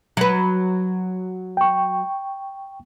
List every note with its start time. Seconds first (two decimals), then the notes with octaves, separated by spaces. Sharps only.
0.17 F#3 B4
1.57 G5 C#6